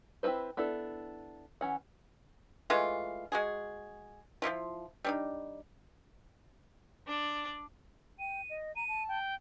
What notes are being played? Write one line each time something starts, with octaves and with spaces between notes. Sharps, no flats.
C4 E4 A4 B4 C5
B3 D4 E4 A4
E3 C#4 F#5
E3 G#3 A3 F4
G#3 F#4 G#4
F3 G#3 E4 F4
G3 D4 D#4
D4 D5
G5 D#7
D#5
A#5 D#7
A5
G5